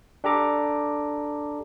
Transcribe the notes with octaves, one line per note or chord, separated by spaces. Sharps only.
D4 G4 A4 A#5 D6